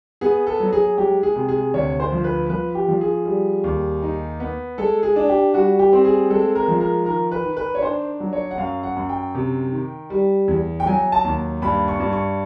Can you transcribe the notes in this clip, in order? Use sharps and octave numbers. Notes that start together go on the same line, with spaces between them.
B3 G#4
A4
F#3
G#4
G#3 G4
G#4
C3
G#4
D2 C#5
C5
F3
B4
F3 B4
G4
F3
G#4
G3
D#2
D#4
B3
G#3 A4
G#4
D4
G4
G3 F#4
G4
C4
G#4
G#3 A4
A#4
F3
A#4
D#3 A#4
B4
D#3
B4
C#5
D4 C5
F#3
C#5
F#5
F#2 F5
F#5
F#2
G5
C3
D#3
G3
E2
G5
F#3 G#5
A5
D#2
G2 B5
C#6
G2
C#6